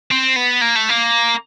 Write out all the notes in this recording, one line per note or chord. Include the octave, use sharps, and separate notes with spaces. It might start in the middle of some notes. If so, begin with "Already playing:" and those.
C4
B3
A#3
A3
A#3